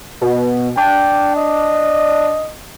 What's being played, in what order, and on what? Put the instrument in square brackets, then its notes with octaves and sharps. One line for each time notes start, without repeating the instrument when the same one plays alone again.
[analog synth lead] B2
[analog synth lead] D4 [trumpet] G5
[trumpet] D#5